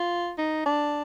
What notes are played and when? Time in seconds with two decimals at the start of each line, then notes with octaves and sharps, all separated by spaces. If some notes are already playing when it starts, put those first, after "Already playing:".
Already playing: F4
0.38 D#4
0.66 D4